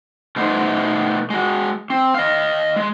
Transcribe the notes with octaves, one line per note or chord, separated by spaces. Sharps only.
B2 A3 B3 D#4 E4 C5
G#3 F#4
C4
D#5 F5
G#3